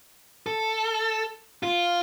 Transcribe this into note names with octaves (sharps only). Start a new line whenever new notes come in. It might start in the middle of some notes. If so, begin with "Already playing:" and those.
A4
F4